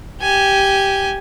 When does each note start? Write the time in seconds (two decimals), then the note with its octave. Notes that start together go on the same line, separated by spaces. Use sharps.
0.22 G4 G#5